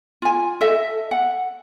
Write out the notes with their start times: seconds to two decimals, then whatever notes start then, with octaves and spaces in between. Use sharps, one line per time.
0.22 F4 G#5
0.61 A4 D#5 E5
1.11 F#5